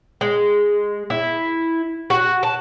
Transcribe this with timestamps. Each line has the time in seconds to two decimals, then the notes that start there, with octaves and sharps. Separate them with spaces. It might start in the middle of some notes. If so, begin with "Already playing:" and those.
0.21 G#3
1.10 E4
2.10 F#4
2.43 A5